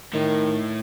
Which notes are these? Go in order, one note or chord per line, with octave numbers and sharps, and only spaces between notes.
A2 D#3